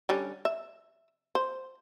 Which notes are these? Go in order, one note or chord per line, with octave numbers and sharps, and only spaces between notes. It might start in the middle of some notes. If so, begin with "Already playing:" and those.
D3 G3 C#4
E5
C5